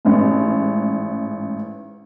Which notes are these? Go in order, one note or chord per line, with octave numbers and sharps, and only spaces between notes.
A1 G#2